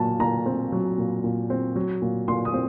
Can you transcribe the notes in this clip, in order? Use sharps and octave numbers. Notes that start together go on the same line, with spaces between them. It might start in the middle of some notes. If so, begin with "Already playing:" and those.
Already playing: A#2 F#3 A5
A#2 A#5
C4
F#3
A#2
A#2
C4
F#3
A#2
A#2 C6
D#6
C4